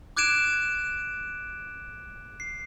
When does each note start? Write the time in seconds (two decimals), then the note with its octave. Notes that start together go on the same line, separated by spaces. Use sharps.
0.17 D6 F#6 G#6 D7 E7
2.40 C7